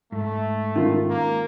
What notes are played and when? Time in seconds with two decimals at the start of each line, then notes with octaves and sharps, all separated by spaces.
0.12 G#2 A3
0.76 D#3 C#4 F4
1.10 A#3